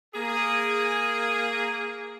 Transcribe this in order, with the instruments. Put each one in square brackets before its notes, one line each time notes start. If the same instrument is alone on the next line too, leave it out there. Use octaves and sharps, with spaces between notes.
[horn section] A#3 G#4